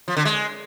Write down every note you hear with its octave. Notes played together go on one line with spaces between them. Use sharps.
F3
D3
G#3